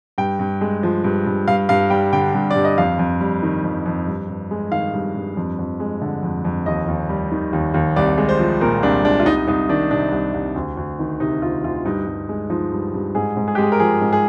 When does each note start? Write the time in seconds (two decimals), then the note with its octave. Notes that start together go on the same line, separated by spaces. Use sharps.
0.18 G2 G5
0.39 G2
0.61 G#3
0.83 F3
1.04 G2
1.26 G2
1.48 G2 F5
1.69 G2 F5
1.90 G3 G5
2.13 D3 G5
2.34 G2
2.51 G2 D5
2.65 D#5
2.78 F2 F5
2.99 F2
3.21 G3
3.42 D#3
3.64 F2
3.86 F2
4.07 G2
4.29 G2
4.51 G#3
4.71 D#3 F5
4.94 G2
5.15 G2
5.37 F2
5.59 F2
5.80 G#3
6.01 D3
6.23 F2
6.45 F2
6.66 D#2 D#5
6.88 D#2
7.09 G3
7.31 D#3
7.53 D#2
7.74 D#2
7.96 C2 D5
8.18 G#3
8.29 C5
8.39 F3
8.61 A#2 A#4
8.83 C2 D4
9.04 G#3 D4
9.20 F4
9.26 C2 D#4
9.47 C2 D#4
9.69 D#3 D4
9.91 C3 D4
10.12 C2
10.34 C2
10.56 D2
10.77 D2
10.99 D#3
11.20 C3 D#4
11.42 D2 F4
11.64 D2 F4
11.85 G2 D#4
12.07 G2
12.29 G#3
12.50 F3 D#4
12.72 G2
12.94 G2
13.15 G#2 G#4
13.36 G#2
13.48 G#4
13.55 G4
13.58 G#3 G#4
13.72 A#4
13.80 F3 G#4
14.01 G#2
14.13 G#4